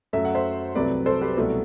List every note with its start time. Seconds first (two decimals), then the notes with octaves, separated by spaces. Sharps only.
0.13 F#2 F#3 A3 E5
0.25 F#5
0.35 C5 E5
0.75 C2 C3 F#3 A3 B4 D5
1.06 A4 C5
1.22 G4 B4
1.37 C2 B2 F#3 A3 F#4 A4